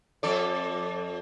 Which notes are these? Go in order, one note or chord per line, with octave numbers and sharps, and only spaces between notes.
F2 A4 D5